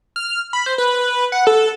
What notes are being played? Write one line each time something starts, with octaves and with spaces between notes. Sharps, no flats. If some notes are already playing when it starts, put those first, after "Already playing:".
F6
B5
C5
B4
F#5
A4